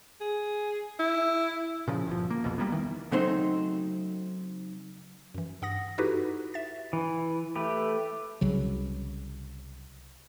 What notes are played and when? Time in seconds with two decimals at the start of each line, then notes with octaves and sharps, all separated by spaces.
0.21 G#4
1.00 E4
1.88 A#2 C#3 F3
2.07 G1 F3
2.30 A#3
2.44 C2 F2 B2
2.58 G3 A#3 B3
2.72 D#3 E3
3.11 C#3 F#3 A3 C4 D#4 C5
5.34 F#2 E3
5.62 G2 F#5 D#6 A#6
5.98 D#4 E4 F#4 G4 A4 B4
6.54 E5 A6
6.93 E3
7.55 A3 G4 B4
8.41 C2 C#3 F#3